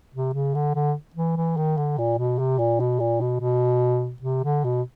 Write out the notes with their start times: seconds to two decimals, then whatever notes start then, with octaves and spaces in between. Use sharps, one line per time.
0.14 C3
0.34 C#3
0.54 D3
0.75 D3
1.15 E3
1.37 E3
1.57 D#3
1.77 D3
1.98 A#2
2.18 B2
2.39 C3
2.59 A#2
2.80 B2
3.00 A#2
3.21 B2
3.40 B2
4.22 C3
4.44 D3
4.64 B2